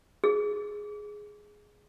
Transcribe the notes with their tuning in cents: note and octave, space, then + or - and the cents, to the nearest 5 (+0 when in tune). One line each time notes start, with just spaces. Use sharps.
G#4 +5